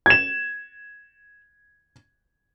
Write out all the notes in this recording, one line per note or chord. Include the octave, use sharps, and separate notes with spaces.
G#6 E7